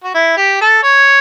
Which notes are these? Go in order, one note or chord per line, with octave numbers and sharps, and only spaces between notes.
F#4
E4
G4
A4
C#5